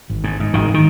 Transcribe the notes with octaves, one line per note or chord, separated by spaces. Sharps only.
G#1
G#2
G#2
G#1 D#3
D#3